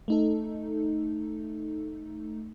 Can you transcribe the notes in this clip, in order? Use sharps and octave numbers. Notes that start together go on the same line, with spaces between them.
A3 D#4 A4